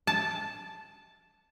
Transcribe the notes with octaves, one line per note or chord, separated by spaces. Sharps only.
A5